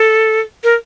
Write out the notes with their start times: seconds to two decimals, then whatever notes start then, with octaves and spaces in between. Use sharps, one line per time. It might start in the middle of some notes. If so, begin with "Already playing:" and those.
Already playing: A4
0.64 A#4